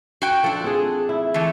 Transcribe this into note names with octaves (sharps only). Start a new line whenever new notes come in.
F#4 G5
F3 D4 A4
C4 G#4
E4
E3 A3